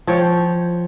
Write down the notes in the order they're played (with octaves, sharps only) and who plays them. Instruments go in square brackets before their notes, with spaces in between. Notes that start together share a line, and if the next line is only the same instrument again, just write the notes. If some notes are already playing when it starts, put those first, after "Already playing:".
[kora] F3 C#5 G5